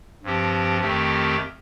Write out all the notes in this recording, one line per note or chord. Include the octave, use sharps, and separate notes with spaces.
G2 F3 C4 G4
F2 D#3 A3 C4 G4